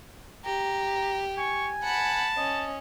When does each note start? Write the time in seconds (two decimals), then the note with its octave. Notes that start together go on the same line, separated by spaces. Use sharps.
0.45 G4 A#5
1.38 G#5 C#6
1.83 F#5 A5 B5
2.37 C#4 D#5